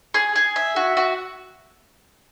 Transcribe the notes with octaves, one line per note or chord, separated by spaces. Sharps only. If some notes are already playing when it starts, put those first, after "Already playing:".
G#4
G#4
E5
F#4
F#4